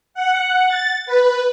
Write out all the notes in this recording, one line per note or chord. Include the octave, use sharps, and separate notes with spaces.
F#5
A6
B4